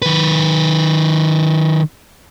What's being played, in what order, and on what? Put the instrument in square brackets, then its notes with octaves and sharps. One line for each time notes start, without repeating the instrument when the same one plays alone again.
[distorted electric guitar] D#3 B4